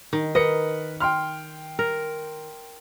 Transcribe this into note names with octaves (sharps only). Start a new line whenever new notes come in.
D#3
A#4 B4 D#5 C#7
G5 C6 F6
A#4